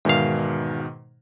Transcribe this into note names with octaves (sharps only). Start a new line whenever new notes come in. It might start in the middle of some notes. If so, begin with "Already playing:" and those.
E2 G#2 B2 D#3 F5